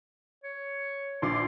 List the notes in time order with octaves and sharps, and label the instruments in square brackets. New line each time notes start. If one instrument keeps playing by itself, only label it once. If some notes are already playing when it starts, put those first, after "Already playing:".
[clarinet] C#5
[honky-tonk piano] A#1 D6 [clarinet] C6